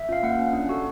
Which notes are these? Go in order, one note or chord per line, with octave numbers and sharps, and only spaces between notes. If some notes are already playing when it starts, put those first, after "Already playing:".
Already playing: E5
C#4 F4 F5
A#3 F#5
C#4 F4
D4
F#4 A4